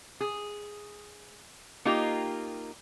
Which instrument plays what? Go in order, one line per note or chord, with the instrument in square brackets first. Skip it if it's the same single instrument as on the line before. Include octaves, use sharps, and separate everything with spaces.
[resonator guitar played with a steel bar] G#4
A#3 D#4 F4 G4